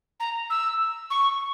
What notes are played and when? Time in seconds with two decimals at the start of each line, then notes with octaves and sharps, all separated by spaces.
0.20 A#5
0.50 E6
1.10 C#6